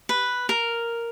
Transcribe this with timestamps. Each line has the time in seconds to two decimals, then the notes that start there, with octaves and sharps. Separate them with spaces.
0.09 B4
0.49 A#4